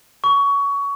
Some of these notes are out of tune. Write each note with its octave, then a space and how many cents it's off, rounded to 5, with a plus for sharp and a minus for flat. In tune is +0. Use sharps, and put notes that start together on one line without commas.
C#6 +20